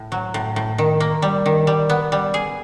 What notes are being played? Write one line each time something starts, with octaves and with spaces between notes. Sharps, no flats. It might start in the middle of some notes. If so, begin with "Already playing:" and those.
Already playing: A2
F#3
A2
A2
D#3
A#3
G3
D#3
G3
B3
G3
G#4